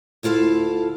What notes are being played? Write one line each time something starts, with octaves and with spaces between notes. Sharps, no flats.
D2 E4 F4 A4 F5